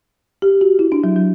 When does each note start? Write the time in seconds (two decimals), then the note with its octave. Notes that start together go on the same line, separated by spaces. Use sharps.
0.42 G4
0.61 F#4
0.79 E4
0.92 D4
1.04 F#3
1.16 F#3